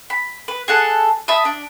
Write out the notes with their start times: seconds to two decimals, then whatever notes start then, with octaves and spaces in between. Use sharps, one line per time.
0.10 B5
0.48 B4
0.68 G#4 A4 F#5 A5
1.28 E5 A5 B5 D#6
1.45 D4